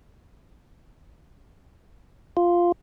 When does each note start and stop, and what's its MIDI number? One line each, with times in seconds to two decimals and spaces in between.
2.37 2.72 65